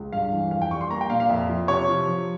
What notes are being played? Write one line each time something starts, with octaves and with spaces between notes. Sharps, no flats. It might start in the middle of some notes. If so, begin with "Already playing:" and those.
Already playing: C#2
G2 F5
E3
F2 F5
G5
G3 C#6
C6
A#3 A#5
G5
A#2 F5
F5
F2 E5
F3
C3 C#5
F3
F3